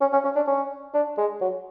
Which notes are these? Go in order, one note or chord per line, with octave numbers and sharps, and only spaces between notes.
C#4
C#4
C#4
D4
C#4
D4
G#3
F#3